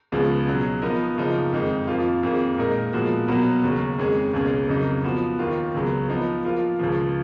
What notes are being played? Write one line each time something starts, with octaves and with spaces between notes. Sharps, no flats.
C#2 C#3 F3 G#3 B3
B2 F#3 C#4 G#4
F3 B3 D#4 A#4
F#2 C#3 F3 A#3 D#4
F2 D#3 G#3 D#4
F2 F3 A#3 F4
F2 D#3 A#3 F4 G#4
A#2 G#3 D#4 A#4
A#2 F3 G#3 B3 F#4
B2 F#3 B3 F#4 A#4
D#2 C#3 F#3 C#4
F2 D#3 G#3 C#4 G#4
C#2 B2 A#3 C#4 G#4
F2 C#3 F#3 A#3 D#4
F3 B3 F#4
D#2 D#3 A#3 F4
C#2 C#3 F#3 B3
F3 B3 D#4 A#4
F3 A#3 F4
C#2 C#3 F3